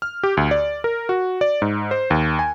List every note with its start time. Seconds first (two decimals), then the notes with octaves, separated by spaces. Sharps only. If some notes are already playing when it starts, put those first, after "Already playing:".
0.02 F6
0.23 G4
0.37 D2
0.51 D5
0.84 A#4
1.09 F#4
1.41 D5
1.62 G#2
1.91 C5
2.10 D#2
2.39 G#5